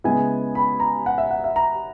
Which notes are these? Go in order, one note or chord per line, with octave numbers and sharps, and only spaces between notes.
C#3 G#3 B3 E4 G#5
B5
A#5
F#5
E5
F#5
E5
A#5